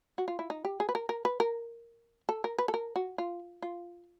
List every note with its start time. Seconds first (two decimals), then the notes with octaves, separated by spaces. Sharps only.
0.18 F#4
0.28 F4
0.39 E4
0.50 D#4
0.65 G4
0.80 G#4
0.89 B4
0.95 A#4
1.09 A#4
1.25 B4
1.40 A#4
2.29 A4
2.44 A#4
2.58 B4
2.68 A4
2.74 A#4
2.96 F#4
3.18 F4
3.62 F4